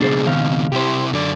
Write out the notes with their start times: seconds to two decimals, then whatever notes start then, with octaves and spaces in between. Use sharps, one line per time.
0.01 C#2 B2 D4 G#4 C5
0.26 D#3 C4 F5
0.72 C3 E4 G4 C5
1.13 F#2 D3 D5